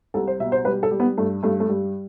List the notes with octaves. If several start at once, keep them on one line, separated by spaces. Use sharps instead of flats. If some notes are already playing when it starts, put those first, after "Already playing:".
C2 A4
C5
B2 E5
C5
G3 B4
A4
G3
B3
G2 A3
G2 A3
A3
G2 G3